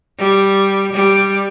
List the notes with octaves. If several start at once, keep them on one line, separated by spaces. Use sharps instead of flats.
G3
G3